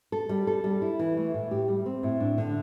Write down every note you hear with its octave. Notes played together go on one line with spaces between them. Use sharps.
A4
G3
A4
G3
E4
E3
A3
A2
G4
G3
C4
A2
D4
D3